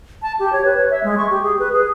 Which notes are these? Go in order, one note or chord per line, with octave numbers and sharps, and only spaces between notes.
A5
G4
C#5
B4
C#5
E5
G#3
C#6
G4
G#4
B4
G#4